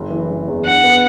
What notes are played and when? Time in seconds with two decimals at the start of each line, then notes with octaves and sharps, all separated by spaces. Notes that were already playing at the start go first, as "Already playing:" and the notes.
Already playing: F#1
0.10 E3
0.29 F#1
0.48 E2
0.65 D4 F#5
0.84 B3